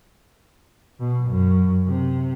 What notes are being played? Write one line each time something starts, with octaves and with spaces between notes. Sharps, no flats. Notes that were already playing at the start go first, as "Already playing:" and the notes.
B2
F#2
C3